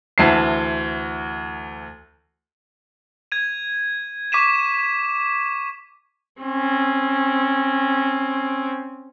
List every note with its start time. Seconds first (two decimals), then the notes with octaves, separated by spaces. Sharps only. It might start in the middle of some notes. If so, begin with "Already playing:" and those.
0.18 D2 E3 A5 C7
3.32 G#6 D#7
4.32 C#6 D6 B6 D#7 E7
6.41 C4 C#4